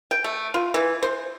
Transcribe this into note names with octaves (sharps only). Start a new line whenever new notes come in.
G5
A3
F4
E3
C5